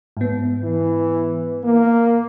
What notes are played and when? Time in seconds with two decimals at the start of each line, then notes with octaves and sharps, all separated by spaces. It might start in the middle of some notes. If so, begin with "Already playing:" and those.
0.17 G#2 B3
0.63 E3
1.64 A#3